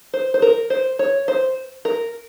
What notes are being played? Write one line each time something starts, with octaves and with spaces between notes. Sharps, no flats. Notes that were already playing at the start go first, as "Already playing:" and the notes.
C5
C5
A#4
C5
C#5
C5
A#4